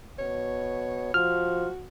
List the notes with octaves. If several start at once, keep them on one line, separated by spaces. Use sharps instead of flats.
B2 C#5
F3 F#4 F6